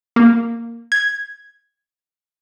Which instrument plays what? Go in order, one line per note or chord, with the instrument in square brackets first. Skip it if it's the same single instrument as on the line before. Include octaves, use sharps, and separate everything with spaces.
[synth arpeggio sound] A#3
G#6